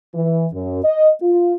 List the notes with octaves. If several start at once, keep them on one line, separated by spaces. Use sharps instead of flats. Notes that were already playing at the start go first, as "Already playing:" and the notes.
E3
F#2
D#5
F4